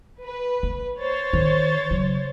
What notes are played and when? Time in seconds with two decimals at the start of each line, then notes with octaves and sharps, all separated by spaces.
0.22 B4
0.63 A#3
0.98 C5 C#5 A6
1.33 D#3
1.91 C#3 F#3